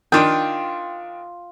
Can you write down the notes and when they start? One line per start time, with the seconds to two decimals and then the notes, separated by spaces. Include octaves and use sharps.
0.12 D#3 D4 F4 G5